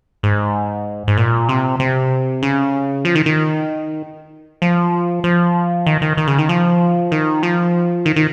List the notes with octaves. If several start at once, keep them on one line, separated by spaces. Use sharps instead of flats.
G#2
G#2
A#2
C3
C3
C#3
F3
D#3
D#3
F3
F3
D#3
D#3
D#3
C#3
D#3
F3
D#3
F3
D#3
D#3